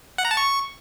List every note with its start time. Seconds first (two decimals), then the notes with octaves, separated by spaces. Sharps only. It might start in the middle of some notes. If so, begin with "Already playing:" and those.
0.18 F#5
0.25 A#5
0.31 A5
0.37 C#6